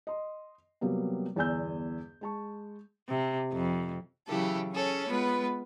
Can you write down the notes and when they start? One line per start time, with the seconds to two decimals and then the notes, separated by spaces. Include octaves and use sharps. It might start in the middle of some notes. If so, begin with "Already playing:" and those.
0.07 D#5 C6
0.81 C3 F#3 G3 A#3 B3
1.36 G1 E2 D5 G#5 E6 G6
2.21 G#3 A5 C#6
3.09 C3
3.53 F2
4.27 C#3 E3 F#3 E4 G4 A4
4.72 C#4 G#4 A4 C#5
5.08 G#3 B3 F4 B4